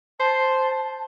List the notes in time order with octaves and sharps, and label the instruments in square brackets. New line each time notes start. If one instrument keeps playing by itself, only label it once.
[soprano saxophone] C5 [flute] A5